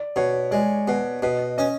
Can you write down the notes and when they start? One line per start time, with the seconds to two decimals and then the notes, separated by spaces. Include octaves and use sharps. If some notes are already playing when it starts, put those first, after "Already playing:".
Already playing: D5
0.16 B2 C#5
0.51 G#3 D5
0.88 B2
1.22 B2 D#5
1.58 C#4 D#5